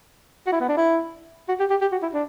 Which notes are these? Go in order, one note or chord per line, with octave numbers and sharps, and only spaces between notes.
F#4
E4
B3
D4
E4
F#4
G4
G4
G4
F#4
E4
D4